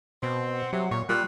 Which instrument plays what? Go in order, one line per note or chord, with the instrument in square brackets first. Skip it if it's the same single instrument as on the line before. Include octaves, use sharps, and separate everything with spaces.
[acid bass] B2 [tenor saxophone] C4
[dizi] F#5
[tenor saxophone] C3 [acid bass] F#3
[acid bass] A#2 [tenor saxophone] C#5
[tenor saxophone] A#2 [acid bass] G3 [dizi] F#6